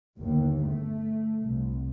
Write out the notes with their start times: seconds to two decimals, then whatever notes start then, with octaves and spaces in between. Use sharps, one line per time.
0.17 G1 D#2
0.65 A3
1.43 C2